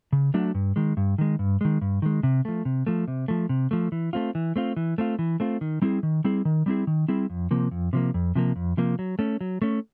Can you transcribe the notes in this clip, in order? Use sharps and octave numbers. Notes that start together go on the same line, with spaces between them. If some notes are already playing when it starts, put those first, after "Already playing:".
C#3
F#3 A3 D4 F#4
G2
D#3 G#3
G2
D#3 G#3
G2
D#3 G#3
G2
D#3 G#3
C3
F3 A3
C3
F3 A3
C3
F3 A3
C3
F3 A3
E3
A3 C4 F4
E3
A3 C4 F4
E3
A3 C4 F4
E3
A3 C4 F4
D#3
G3 C4 E4 G#4
D#3
G3 C4 E4 G#4
D#3
G3 C4 E4 G#4
D#3
G3 C4 E4 G#4
F2
C3 F3 A#3
F2
C3 F3 A#3
F2
C3 F3 A#3
F2
C3 F3 A#3
F#3
A3 C#4
F#3
A3 C#4